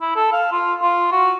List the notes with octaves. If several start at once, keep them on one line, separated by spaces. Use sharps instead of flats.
E4
A4
F5
F4
F4
F#4